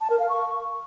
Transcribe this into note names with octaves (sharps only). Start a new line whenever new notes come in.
A5
A#4
F5
C#6